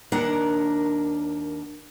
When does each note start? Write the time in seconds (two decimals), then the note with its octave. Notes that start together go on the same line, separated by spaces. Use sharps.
0.12 D#2 D4 A#4 F#5